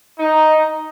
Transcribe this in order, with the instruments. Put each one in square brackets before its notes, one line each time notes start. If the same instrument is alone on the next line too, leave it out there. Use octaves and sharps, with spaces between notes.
[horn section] D#4